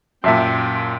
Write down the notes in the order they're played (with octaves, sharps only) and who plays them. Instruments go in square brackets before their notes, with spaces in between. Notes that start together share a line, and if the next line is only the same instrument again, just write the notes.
[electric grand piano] F#2 A#2 [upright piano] E5 A5 C6 [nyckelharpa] G5